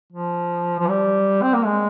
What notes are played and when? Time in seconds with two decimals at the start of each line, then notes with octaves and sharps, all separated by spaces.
0.12 F3
0.79 F3
0.89 G3
1.42 C4
1.54 A#3
1.65 G#3